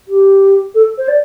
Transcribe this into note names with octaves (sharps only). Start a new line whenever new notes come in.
G4
A4
C5
D5